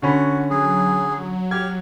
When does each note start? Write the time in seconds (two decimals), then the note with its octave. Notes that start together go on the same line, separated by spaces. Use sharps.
0.02 D3 C#4 F#4 B5
0.50 F#3 G#4
1.51 G4 F6 G#6